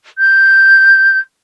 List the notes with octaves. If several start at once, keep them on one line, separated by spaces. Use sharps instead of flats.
G6